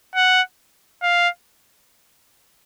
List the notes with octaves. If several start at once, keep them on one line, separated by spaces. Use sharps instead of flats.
F#5
F5